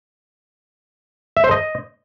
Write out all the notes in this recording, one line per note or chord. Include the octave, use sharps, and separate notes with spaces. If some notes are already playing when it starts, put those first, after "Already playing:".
E5
C5
D#5